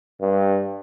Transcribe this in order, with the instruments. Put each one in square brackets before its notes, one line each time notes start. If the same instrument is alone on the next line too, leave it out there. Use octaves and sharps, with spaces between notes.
[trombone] G2